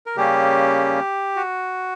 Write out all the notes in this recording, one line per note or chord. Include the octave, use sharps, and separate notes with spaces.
A#4
C#3 G3 A#3 C#4 G4
F#4